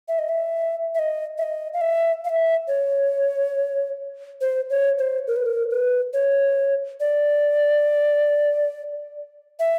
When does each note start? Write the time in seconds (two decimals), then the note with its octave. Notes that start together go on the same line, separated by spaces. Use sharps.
0.08 E5
0.19 D#5
0.29 E5
0.95 E5
0.99 D#5
1.38 E5
1.43 D#5
1.74 F5
1.81 E5
2.25 F5
2.29 E5
2.68 C#5
4.41 C5
4.70 C#5
4.99 C5
5.27 A#4
5.36 B4
5.46 A#4
5.71 B4
6.13 C#5
7.00 D5
9.59 E5